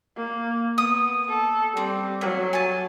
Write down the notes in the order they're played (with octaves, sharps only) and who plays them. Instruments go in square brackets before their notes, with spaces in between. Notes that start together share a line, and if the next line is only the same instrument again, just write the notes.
[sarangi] A#3
[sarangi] B3 [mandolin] D#6
[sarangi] A4
[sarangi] G3 [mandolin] C4
[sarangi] F#3 [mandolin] A3
[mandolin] G#5 A5